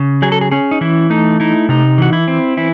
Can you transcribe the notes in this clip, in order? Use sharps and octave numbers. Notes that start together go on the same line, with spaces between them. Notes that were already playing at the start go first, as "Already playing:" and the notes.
Already playing: C#3
F#3 G#4
A4
G#4
C#4 G#4
D#4
E3 E4
A3 D#4
D#4 E4
C3 D#4
E3 F#4
E4
C4
E3 E4